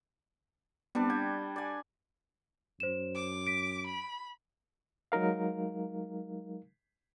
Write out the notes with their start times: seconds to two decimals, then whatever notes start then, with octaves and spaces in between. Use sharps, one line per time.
0.95 G3 B3 C4 D4
1.10 G5 G#6
1.56 D5 G#5
2.80 F#2 C5 E7
3.15 D6
3.47 B6 D7
3.86 B5
5.12 F#3 G#3 D#4 A#4 F5